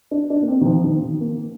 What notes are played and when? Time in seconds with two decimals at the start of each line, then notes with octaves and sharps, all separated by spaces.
0.11 D4
0.30 D4
0.42 A#3
0.48 C4
0.61 D#3
0.66 F3
0.84 D#3
1.02 D#3
1.20 A#3